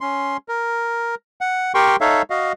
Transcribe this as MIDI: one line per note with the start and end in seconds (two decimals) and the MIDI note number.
0.01 0.37 61
0.01 0.37 84
0.48 1.15 70
1.41 1.72 78
1.74 1.96 67
1.74 1.96 70
1.74 1.96 79
1.74 1.96 84
1.74 1.96 85
2.01 2.22 63
2.01 2.22 69
2.01 2.22 73
2.01 2.22 76
2.01 2.22 77
2.30 2.52 66
2.30 2.52 75
2.30 2.52 77